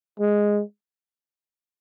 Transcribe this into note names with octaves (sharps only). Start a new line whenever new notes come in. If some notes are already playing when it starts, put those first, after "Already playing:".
G#3